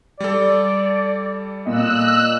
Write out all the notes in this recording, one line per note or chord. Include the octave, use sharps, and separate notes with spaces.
G3 A4 D5
A#2 D#5 E6 F#6